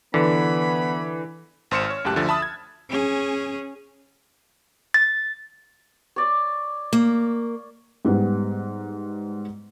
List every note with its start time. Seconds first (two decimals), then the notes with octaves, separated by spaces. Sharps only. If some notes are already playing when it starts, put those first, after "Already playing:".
0.14 D3 E3 B3 B5
1.71 G#1 C5 C6 F6 C#7 E7
1.90 C#5
2.04 C#2 F#2 A2 G4 A5 F#6
2.16 D2 D3 F3 E5 A6
2.28 E5 A5 B5 D#6
2.42 G#6
2.89 C#4 G#4
4.94 A6
6.16 C#5 D5
6.93 A#3
8.05 G#2 G3 B3